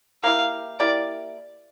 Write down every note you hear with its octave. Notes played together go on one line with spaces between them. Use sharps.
A#3 E4 G4 F5
A#3 E4 G4 D5